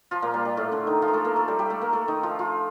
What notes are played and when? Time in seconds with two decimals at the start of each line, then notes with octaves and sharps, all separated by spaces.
0.11 F3 F4
0.22 A#2 A#3
0.34 G3
0.45 G3
0.57 A2 A3
0.72 D3 D4
0.87 D#3 D#4
1.02 F3 F4
1.08 A#4
1.13 A3 A4
1.25 A#3 A#4
1.36 A3 A4
1.48 G3 G4
1.59 G3 G4
1.70 A3 A4
1.81 A#3 A#4
1.93 A3 A4
2.08 D#3 D#4
2.23 F3 F4
2.39 F3 F4